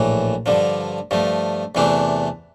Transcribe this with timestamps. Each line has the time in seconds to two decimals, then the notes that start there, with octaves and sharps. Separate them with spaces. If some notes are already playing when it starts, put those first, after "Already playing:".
Already playing: A#1 A2 E3
0.46 G2 D3 F3
1.11 G2 F3 A3
1.75 E2 C3 E3 A3 D4